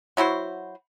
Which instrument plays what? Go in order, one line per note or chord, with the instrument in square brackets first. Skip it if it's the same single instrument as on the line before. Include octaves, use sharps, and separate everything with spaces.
[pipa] F#3 E4 F#4 C5